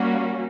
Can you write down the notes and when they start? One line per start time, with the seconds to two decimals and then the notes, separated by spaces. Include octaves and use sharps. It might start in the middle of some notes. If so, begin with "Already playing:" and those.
Already playing: G3 A#3 C#4 F#4